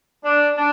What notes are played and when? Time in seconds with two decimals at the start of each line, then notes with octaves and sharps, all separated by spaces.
0.25 D4
0.57 D4